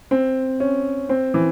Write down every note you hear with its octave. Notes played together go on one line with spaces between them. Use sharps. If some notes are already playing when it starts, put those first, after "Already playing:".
C4
C#4
C4
E3